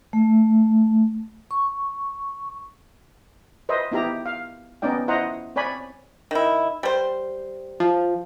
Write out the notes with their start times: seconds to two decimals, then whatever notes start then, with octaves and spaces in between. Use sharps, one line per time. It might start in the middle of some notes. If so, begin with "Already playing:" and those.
0.13 A3
1.51 C#6
3.69 B4 C5 D#5 E5
3.91 B3 D#4 E4 G4 A#5
4.26 F5
4.82 B3 C#4 D#4 D5 G5
5.08 E4 C5 D#5 F#5 A#5
5.56 C4 C#5 D5 G#5 B5
6.31 D#3 E4
6.83 G3 C5
7.80 F3